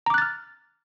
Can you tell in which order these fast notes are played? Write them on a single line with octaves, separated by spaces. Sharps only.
A#5 D6 F#6 A6 F6